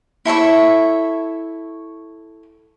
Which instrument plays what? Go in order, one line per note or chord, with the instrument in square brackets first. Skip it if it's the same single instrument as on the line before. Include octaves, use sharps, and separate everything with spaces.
[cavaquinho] E4 A4 C#5 E5